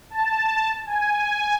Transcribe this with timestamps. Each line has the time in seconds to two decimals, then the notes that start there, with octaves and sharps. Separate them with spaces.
0.10 A5
0.86 G#5